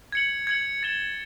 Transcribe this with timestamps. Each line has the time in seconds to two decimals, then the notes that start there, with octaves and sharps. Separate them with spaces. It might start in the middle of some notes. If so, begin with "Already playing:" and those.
0.12 G#6 C#7 F#7
0.47 G#6 C#7 F#7
0.83 A6 C#7 E7 G7